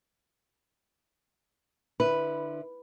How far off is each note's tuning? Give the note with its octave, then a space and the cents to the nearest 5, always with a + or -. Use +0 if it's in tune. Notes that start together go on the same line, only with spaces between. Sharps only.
D3 +25 E4 +0 B4 +0